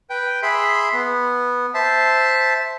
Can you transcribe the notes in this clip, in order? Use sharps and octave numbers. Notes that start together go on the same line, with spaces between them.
B4 G5
G#4 E5 B5 C6
B3
C5 E5 A5